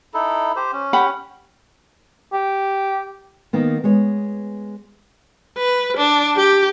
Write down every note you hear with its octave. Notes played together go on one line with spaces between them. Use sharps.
D#4 E4 A4
G4 C5
C#4
G4 F#5 B5
G4
D#3 A#3 B3
G#3 B3 C#5
B4
D4
G4